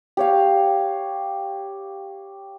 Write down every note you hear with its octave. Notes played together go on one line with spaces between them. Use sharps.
G4 C#5 F5